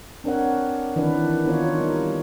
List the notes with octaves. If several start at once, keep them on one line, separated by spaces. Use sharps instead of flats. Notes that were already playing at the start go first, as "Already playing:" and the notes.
C4 D4 A#4 C#5 F#5
D#3 E3 D4 B4
D#3 B3 D#4 F4 C#5
G3 D#4